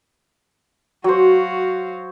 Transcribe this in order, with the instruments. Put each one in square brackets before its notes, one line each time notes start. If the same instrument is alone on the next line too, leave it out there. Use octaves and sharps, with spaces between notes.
[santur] F#3 C5 [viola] F#4 F5